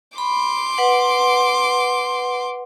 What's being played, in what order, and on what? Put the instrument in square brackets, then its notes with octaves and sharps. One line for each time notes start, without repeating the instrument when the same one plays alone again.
[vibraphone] B5 [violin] C6 D6
[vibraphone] B4 F#5